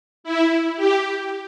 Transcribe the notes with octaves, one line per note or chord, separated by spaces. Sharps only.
E4
G4